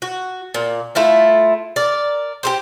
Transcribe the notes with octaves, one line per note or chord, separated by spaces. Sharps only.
F#4
A#2
A3 E4 F4
A#4 D5
G4 A#4 C5